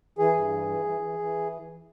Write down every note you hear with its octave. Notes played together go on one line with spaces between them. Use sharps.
E3 G#4
G2
E3
E3
E3
E3
E3